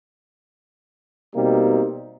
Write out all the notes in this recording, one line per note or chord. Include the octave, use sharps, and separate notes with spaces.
B2 G3 A#3 C4 D#4